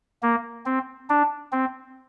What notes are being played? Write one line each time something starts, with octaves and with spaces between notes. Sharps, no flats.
A#3
C4
D4
C4